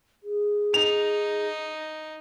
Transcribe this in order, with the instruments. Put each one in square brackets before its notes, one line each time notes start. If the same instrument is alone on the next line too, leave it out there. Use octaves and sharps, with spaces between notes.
[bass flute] G#4
[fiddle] D#4 [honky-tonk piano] F7